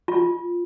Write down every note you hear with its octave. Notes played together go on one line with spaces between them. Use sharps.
F4